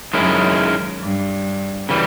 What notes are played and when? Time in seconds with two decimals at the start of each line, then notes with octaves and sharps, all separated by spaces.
0.13 F#2 D#3 G#3 C#4 E4
1.01 G2
1.89 C#3 E3 G3